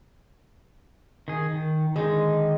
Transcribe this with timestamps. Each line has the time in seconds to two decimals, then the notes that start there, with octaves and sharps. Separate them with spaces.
1.28 D#3 G#4
1.52 D#3
1.96 D3 D#3 G#3 D#4